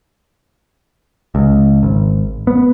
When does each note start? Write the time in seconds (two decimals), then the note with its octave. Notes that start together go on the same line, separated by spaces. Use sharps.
1.35 C#2
1.83 G#1
2.47 B3